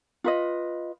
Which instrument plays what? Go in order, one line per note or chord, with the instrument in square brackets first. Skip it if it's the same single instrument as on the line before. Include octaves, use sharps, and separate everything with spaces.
[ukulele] F4 B4 D#5